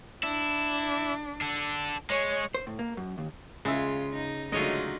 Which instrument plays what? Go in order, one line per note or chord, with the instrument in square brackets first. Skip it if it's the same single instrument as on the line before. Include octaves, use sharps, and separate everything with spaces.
[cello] D4 [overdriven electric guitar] E4
[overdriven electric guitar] D4 A4
[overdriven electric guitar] G#3 [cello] C#5
[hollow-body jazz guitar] C5
A2
A#3
F#2
D#2
[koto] C#3 [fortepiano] G#3 E5 [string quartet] F4
[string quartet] D#4
[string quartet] D3 F#3 D#4 [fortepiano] G#3 A3 [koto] F4 C#5 D#5